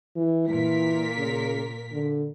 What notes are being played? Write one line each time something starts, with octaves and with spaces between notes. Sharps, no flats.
E3
A#2 E3 A#4 B6
C#3
D3